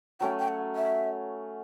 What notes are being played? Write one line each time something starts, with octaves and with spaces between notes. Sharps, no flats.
F#3 A3 C#4 G5
G5
F#5
E5